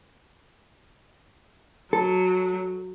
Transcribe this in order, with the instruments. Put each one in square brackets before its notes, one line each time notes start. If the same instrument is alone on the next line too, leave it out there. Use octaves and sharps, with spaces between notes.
[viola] F#3 [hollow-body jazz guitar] A4